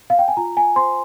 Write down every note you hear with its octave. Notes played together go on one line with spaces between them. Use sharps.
F5
G5
G#5
F4 A#5
G#5
C5 C6